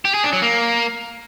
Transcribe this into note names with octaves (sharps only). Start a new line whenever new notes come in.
G4
G#4
D4
F#3
A#3